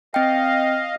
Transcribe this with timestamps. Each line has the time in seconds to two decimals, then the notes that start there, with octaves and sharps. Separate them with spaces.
0.14 C4 D#5 F5 G5